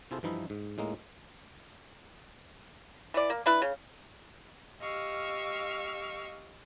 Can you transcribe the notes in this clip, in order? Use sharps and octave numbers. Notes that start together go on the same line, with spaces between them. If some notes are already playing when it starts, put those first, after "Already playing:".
C3 E4 F4 G#4 A4 C5
G2 E3 F3 D#4 E4
G#2
A2 G#3 A#3 D#4
E3 D5
A#3
D4 E4 B4
C#3
G4 D#5 F5 C#6 E6 F6